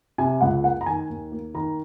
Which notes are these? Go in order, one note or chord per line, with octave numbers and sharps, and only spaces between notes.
C3 G#5
C#2 F#5
A#3 F#5
A#5
D#3 G#5
D#2
A#3
D#3 A#5